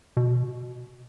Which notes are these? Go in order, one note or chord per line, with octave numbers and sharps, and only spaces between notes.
B2